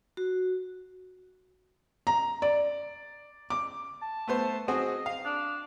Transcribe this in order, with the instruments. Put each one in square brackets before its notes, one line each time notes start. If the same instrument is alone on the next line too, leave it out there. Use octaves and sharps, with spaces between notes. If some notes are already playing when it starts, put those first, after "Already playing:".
[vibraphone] F#4
[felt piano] A#5
D5
D6
[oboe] A5
[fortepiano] A3 B3 C5
[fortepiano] C4 F#4 G#4 [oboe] D#5
[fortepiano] F5
[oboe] D4